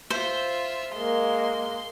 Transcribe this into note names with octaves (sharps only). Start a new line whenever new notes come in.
F4 C5 E5
G#3 A#3 C6